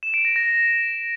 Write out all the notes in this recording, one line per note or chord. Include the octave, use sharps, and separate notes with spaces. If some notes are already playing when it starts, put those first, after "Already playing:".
E7
D7
A#6
A#6